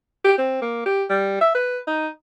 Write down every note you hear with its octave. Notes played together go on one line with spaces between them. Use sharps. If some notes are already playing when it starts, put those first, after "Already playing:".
G4
C4
A#3
G4
G3
E5
B4
D#4